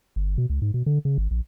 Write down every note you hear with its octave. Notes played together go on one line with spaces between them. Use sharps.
G1
B2
C#2
G#2
B2
D3
C#3
G#1
A#1